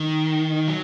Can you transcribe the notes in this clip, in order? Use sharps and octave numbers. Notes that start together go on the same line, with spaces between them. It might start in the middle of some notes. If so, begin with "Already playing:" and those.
Already playing: D#3
F#3